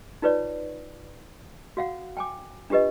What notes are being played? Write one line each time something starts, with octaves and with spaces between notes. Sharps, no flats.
D#4 F4 B4 C#5 D5
F#4 F5 F#5
G5 G#5 D6
D4 F4 G4 B4 D#5